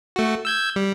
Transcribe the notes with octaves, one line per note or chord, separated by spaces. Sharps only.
A3 F#4
E6 G6 G#6
G3